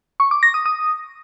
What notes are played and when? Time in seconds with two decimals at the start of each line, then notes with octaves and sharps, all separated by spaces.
0.20 C#6
0.31 D6
0.43 A#6
0.54 D#6
0.66 D#6